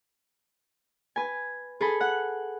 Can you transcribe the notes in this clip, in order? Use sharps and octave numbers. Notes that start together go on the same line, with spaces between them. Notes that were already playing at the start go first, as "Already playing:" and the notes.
B4 G#5
G#4 A4 B5
F#5